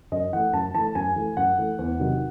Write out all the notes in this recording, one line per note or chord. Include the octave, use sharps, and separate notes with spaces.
F#2 D#5
E3 A3 F#5
F#2 A5
E3 A3 A5
F#2 G#5
E3 A3
F#2 F#5
E3 A3
E2
C3 D#3 F#3